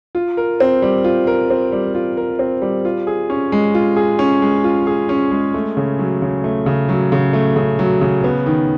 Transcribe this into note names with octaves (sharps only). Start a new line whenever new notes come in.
F4
A#4
C4
G3
F4
A#4
C4
G3
F4
A#4
C4
G3
F4
G#4
C#4
G#3
F4
G#4
C#4
G#3
F4
G#4
C#4
G#3
A3
C#3
F#3
C#3
A3
C#3
F#3
C#3
A3
C#3
F#3
C#3
B3
D#3